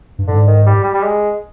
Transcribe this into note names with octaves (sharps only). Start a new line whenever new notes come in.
G2
G#2 D3
D#3
G3
G3
G3
G#3